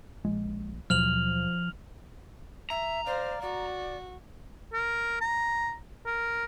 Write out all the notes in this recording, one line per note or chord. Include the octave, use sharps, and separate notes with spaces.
A#1 G#3
D#2 B2 F3 F#3 F6 F7 F#7
E5 A#5
C5 D5 F5
F#4 D5
A#4
A#5
A#4